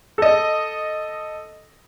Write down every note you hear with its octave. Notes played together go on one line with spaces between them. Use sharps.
A4 D#5